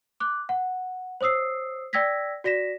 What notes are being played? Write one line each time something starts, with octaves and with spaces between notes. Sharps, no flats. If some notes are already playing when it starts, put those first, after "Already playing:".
D6 F#6
F#5
C5 C#5 D#6 E6 C7
D5 G5 E6 G#6 A#6 B6
F#4 D5 A#6 B6 E7